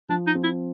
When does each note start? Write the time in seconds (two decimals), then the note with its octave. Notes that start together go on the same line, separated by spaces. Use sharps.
0.09 F3 D4
0.27 D#4
0.35 C4
0.43 E4